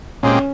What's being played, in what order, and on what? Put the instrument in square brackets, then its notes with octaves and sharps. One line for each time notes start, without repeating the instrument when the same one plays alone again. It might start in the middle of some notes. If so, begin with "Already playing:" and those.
[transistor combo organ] A#2 G#3 C4 G4 [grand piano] C#4